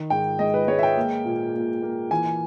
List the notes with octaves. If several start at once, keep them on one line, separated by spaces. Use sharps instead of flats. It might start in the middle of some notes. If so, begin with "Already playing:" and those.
Already playing: D#3
G#2 G5
G#3 D#5
B4
G#3 C#5
E5
G5
A#3
A#2
A#2
A#3
E3 G#5